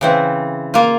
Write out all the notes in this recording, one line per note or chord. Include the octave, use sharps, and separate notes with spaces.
C#3 E3 C4
A#3 F4